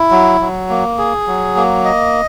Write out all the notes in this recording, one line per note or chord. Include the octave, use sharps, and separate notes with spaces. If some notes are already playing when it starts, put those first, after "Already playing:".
Already playing: E4
F#3
F#3
A#3
G#4
F#3
A#3
D#5